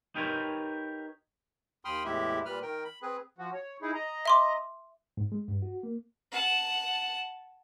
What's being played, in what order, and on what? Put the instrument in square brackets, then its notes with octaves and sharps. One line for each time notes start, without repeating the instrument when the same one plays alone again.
[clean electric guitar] D#4 G4 A#4 B4 C#5
[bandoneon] D#2 G5 B5 C6 D#6 F6
E2 A2 G#3 E4 G4 E5
A#2 G3 B4 B5 F6
D#3 A#4 G5
B5
C4 G#4 B4
[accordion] F3 F#4
C#5
D#4 E4 G#4
D#5 A#5
[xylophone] E5 C6 D6
[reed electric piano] G#2
G#3
G2
F#4
A#3
[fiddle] F#5 A5